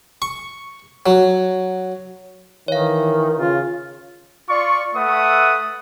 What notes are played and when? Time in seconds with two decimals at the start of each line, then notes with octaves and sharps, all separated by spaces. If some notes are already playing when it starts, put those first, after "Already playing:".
0.22 C#6
1.06 F#3
2.68 D#3 E3 C#5 F5
3.39 C#3 F4
4.49 F4 D5 C#6
4.95 A3 B4 E5 F#5 D#6